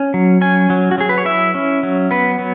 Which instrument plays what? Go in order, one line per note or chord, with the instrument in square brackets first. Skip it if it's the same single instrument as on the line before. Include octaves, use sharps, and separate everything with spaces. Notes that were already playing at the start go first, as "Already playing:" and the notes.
Already playing: [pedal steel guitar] C#4
F#3
C#4 G#5
F#3
F#4
F#3 G#4
B4
C#5
E4 E5
C#4
F#3
B3 B4
F#3